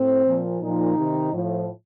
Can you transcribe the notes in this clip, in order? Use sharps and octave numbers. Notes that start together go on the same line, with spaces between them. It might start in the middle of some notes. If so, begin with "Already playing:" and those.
Already playing: A2 C4
A#2 F3
A#2 F3 D#4
C3 D#3
A2 F3